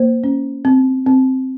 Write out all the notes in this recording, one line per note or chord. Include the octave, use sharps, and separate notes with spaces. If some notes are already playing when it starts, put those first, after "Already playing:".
Already playing: A#3 C5
C#4
C4
C4